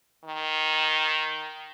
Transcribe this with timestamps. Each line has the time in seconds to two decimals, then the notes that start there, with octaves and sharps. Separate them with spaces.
0.25 D#3